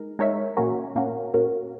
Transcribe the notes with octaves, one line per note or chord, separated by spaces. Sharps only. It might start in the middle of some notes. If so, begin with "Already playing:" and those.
Already playing: G#3 D#4 A#4
G#3 D#4 A#4 C#5 E5
A#2 A#3 C#4 F#4 A#4
A#2 A#3 C#4 F#4 A#4
A#2 A#3 C#4 F#4 A#4